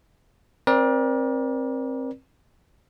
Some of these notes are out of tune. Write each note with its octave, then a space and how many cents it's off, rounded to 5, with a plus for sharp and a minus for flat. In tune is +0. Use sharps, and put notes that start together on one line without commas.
C4 +20 A#4 +40 D5 +0